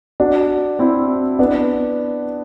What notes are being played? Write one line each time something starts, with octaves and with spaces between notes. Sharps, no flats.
D4 F#4
C4 E4
B3 D4